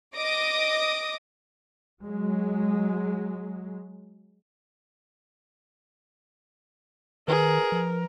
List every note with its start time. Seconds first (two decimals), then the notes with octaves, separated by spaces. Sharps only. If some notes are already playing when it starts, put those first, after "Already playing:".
0.16 D#5 D6 D#6 A#6
2.04 F#3 G#3
7.28 D#3 G#4 A#4 B4
7.72 F3